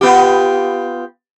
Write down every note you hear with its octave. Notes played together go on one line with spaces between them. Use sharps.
B3 F4 G4